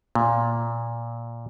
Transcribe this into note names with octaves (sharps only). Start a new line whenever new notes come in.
A#2